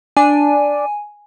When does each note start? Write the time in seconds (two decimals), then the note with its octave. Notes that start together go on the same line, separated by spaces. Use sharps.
0.17 D4 G#5